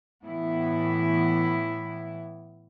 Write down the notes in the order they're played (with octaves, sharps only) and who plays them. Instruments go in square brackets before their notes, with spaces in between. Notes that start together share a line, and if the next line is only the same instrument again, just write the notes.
[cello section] A2 E3 B3 E4